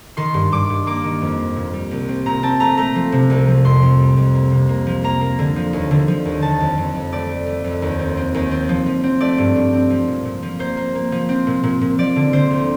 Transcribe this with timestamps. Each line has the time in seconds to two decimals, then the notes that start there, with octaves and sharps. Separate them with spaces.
0.17 D#3 C6
0.34 G2
0.52 G2 D6
0.70 G2
0.87 A#3 D6
1.04 D#3
1.22 F2
1.39 A#3
1.56 A#2
1.73 G3
1.91 C2
2.08 C4
2.26 A#2 A#5
2.43 C4 A5
2.60 A3 A#5
2.78 A3 A#5
2.95 F3
3.12 C3
3.30 C2
3.48 F3
3.65 F2 C6
3.82 F2
4.00 G3
4.17 F2
4.35 A#3
4.52 C3
4.69 A#3
4.87 F3
5.04 A#3 A#5
5.21 A#3
5.39 D3
5.56 F3
5.73 D#2
5.91 D3
6.08 F3
6.25 D#2
6.42 D#3 A5
6.60 F2
6.78 F2
6.94 F2
7.12 A3 D5
7.29 A3
7.46 A3
7.64 F2
7.82 D#2
7.99 C4
8.17 C4
8.34 D#2
8.51 C4
8.69 F3
8.86 F3
9.04 C4
9.21 A3 D5
9.38 G2
9.56 G2
9.73 C4
9.90 F3
10.08 A#2
10.25 A#2
10.43 F3
10.59 A#3 C5
10.77 A#3
10.95 A#3
11.12 F3
11.29 C4
11.47 A#2
11.64 A#2
11.81 A#2
11.98 F3 D5
12.16 D3
12.33 D3 C5
12.51 D2